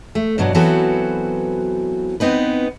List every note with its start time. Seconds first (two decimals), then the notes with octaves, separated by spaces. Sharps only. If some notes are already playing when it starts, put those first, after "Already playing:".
0.15 A3
0.38 G2 B2 F#3 D4
0.55 E3 F#3 B3 C4 F#4 A4
2.20 B3 C4 D#4 B4